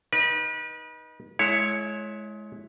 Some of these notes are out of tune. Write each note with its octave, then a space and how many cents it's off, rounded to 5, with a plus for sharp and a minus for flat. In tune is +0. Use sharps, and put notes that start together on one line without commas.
D#4 +0 B4 -35
G#3 +25 E4 +0 C#5 +0